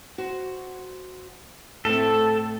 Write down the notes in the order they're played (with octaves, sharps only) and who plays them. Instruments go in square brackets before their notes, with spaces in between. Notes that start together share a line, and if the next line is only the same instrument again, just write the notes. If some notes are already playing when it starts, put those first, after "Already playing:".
[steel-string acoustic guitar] F#4 C5
[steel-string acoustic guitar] A2 A3 C4 [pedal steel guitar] A4